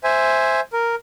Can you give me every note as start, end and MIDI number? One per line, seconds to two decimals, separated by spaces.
0.04 0.60 72
0.04 0.60 76
0.04 0.60 80
0.73 0.95 70